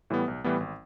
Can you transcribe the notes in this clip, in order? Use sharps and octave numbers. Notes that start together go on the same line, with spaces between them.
A2 E3 G3 B3
B1
A2 E3 G3 B3
G#1